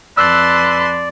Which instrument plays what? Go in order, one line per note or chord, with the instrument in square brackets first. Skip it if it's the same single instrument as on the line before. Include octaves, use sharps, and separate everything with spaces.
[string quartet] F2 A5 C6 [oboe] B4 [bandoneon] D5 [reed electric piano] E6 F#6